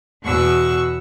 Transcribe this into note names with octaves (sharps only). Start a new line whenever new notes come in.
E2 B2 F#4 C#6 E6